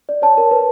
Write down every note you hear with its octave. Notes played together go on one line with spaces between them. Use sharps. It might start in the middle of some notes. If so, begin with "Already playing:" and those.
D5
C#5 A5
A#4
B4